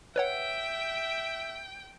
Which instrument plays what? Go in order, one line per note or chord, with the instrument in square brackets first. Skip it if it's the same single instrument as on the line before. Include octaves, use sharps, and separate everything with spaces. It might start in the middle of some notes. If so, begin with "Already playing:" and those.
[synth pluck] B4 C#5 F#5 [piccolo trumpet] E5 [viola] G5